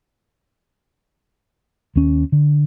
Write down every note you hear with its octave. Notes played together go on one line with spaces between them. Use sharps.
D#2 C#4
D3